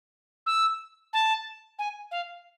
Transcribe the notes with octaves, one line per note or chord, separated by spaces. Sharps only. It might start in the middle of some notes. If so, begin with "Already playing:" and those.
E6
A5
G#5
F5